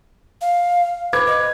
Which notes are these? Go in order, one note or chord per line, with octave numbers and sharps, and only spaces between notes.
F5
B4 C5 D6 G#6
D#5